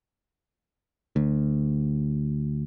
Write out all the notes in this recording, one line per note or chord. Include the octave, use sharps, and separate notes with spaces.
D2